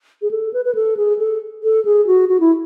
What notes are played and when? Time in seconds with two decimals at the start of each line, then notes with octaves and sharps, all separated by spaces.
0.22 G#4
0.31 A4
0.53 B4
0.65 B4
0.75 A4
0.97 G#4
1.19 A4
1.64 A4
1.85 G#4
2.07 F#4
2.29 F#4
2.40 E4